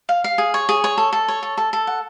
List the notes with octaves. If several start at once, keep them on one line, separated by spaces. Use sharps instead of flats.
F5
F5
G#4
C#5
G#4
C#5
A4
A4
C#5
A4
A4
A4
F#5